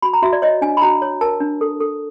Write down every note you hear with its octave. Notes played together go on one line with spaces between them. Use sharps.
F#4 B5
A#5
F#4 E5
D5
C#5 D#5
D4 G#5
B5
F#4 A#5
C#5
A#4 A5
D4
A4
A4